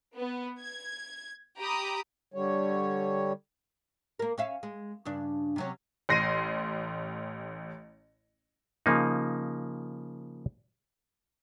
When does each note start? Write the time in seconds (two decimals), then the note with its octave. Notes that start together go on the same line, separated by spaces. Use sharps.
0.16 B3
0.59 G#6
1.58 G4 A#5 B5 D#6
2.34 D3 G3 C#5
4.19 A#3 A#4
4.38 C#4 E5 F5
4.63 G#3
5.05 G2 C#3 D4
5.56 C3 F#3 C#4
6.09 A1 C6 A#6 C7 D#7
8.86 C#3 F3 A#3 D#4